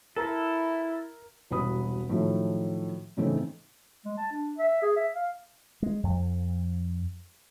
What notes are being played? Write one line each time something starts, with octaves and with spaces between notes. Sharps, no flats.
E4 A4 A#4 A#5
E1 C2 F#4 B4 B5 D#6
A2 D#3 F3 F#3 A3
A2 C#3 E3 A3 C4 D#4
G#3
A5
D4
E5
G#4
E5
F5
G#3
F2